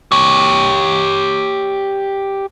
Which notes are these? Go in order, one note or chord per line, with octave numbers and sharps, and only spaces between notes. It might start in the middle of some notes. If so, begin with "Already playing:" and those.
G4 C#5